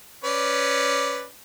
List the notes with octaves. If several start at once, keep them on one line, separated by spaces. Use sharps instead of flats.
C#4 B4 D5